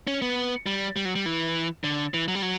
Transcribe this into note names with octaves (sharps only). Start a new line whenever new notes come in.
C#4
B3
G3
G3
F#3
G3
E3
D3
E3
F#3
G3
F#3